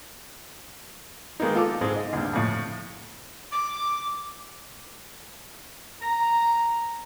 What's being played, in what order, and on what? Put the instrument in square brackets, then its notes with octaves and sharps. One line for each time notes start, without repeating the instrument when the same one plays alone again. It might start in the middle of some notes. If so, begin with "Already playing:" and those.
[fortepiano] D#3 G#3 A#3 B3 D#4
F4 A4 D6
G#2 G#3 C4
D#5
D2 G2
F2 A2
[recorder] D6
[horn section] A#5